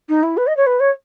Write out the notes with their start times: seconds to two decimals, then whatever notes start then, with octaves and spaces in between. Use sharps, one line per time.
0.09 D#4
0.23 E4
0.37 B4
0.47 D#5
0.57 C#5
0.67 B4
0.80 C#5